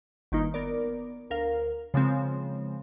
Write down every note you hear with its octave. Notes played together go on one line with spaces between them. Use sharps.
G1 D#3 A#3 D#4
B3 A#4 D5
D2 A#4 F5
C#3 F3 G#3 C4